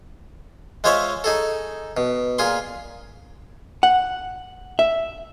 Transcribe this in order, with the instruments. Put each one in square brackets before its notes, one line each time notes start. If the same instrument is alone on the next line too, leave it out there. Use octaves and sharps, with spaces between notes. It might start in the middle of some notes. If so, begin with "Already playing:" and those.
[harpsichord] G#3 F4 C5 C#5 D#5 E5
D#4 G#4 A4
B2
A#2 F4 G#4 C6
[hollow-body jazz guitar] F#5
E5